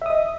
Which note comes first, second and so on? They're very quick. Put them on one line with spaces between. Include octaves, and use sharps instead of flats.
E5 D#6 D#5